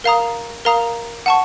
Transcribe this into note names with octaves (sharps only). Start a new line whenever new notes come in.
A#4 F5 A#5 D#6
A#4 F5 A#5 D#6
F#5 A5 C#6